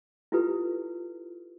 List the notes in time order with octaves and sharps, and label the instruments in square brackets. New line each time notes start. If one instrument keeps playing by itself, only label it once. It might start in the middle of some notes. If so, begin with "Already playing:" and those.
[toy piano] E4 F4 G4 A4 B4